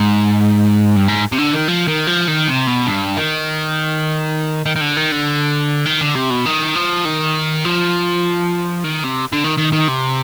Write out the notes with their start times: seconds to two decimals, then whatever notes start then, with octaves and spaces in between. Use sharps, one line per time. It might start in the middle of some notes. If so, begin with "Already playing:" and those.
Already playing: G#2
0.96 G2
1.08 G#2
1.32 C3
1.39 D3
1.53 D#3
1.68 F3
1.88 D#3
2.07 F3
2.28 D#3
2.48 C3
2.67 B2
2.87 G2
3.17 D#3
4.66 D#3
4.76 D#3
4.81 D3
4.97 D#3
5.12 D3
5.86 D#3
6.01 D3
6.15 C3
6.30 B2
6.46 D#3
6.75 F3
7.05 D#3
7.65 F3
8.84 D#3
9.04 C3
9.32 D3
9.44 D#3
9.58 D#3
9.73 D#3
9.89 C3